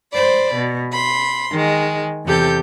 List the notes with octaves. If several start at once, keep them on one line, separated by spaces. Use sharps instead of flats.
C5 D5 B5
B2
B5 C6
D#3 G#3
E2 C3 G4 A4 G6